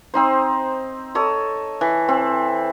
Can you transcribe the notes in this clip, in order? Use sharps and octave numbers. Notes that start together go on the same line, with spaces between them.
C4 D#4 C5
A4 C#5 D#5
E3
C4